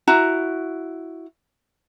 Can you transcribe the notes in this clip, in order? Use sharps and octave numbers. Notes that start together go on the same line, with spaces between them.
E4 F#4 A#5